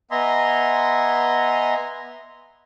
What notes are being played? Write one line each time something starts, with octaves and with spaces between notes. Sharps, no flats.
B3 D#5 E5 G#5 A#5 C6